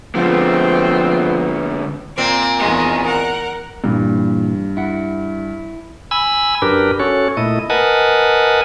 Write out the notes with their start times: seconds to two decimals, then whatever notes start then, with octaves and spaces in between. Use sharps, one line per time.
0.15 D3 F3 G#3 A3 B3 C4
2.18 A#2 C4 D6
2.59 E2 D#3 G#3
3.05 A#4 F#5
3.84 G2 A#2 E3
4.77 E4 F#5
6.11 G#5 B5 E6
6.62 F#2 D4 G4 A#4 B4
7.00 C#4 F#4 A4 C#5
7.37 A#2 A3 E4 D#5
7.70 A#4 B4 D#5 F#5 G#5 A5